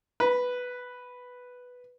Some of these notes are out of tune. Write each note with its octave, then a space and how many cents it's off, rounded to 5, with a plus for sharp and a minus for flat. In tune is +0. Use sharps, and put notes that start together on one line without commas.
B4 +0 B5 -45